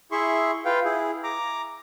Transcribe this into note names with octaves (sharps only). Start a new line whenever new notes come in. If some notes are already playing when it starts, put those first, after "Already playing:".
E4 G#4 E5 C6 C#6
F4 B4 F5 G5
E4 G#4
A#5 D6